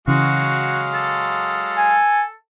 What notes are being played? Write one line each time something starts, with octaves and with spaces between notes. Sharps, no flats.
C#3 E3 F#3 G#3 F#4 F5
A4
G#5